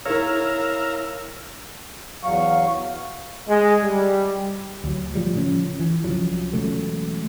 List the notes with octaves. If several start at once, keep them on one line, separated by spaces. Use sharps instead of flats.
E4 A#4 C#5 E5 F5 A#5
E2 F#3 F5 C#6
G#3
G3
D2 F#3
A2 F3 G3
C#3 F3 C#4
E3
C2 C#3 F3 F#3
E1 C#3 F#3 A3